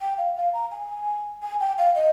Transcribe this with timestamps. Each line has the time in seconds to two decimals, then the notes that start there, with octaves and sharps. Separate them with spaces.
0.01 G5
0.18 F5
0.36 F5
0.53 A#5
0.71 G#5
1.42 G#5
1.60 G5
1.78 F5
1.95 D#5